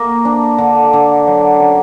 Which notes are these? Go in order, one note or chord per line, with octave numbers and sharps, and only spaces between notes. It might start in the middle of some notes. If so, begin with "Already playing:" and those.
Already playing: A#3
D4
D3
D3
F#3
C#4